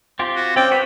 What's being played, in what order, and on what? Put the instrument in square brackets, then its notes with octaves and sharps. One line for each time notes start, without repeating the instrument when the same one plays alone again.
[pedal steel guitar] C4 F4 G4
[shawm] F#4
[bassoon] C4 [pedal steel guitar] C#4 D5 [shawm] G5
[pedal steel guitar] F#4 G4 [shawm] B4